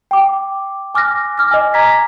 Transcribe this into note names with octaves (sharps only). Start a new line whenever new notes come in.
G5 D6
G#5 D6 F6 F#6 A#6
D6 F6 A#6
D#5 G#5
A#5 D6 G#6 A#6 B6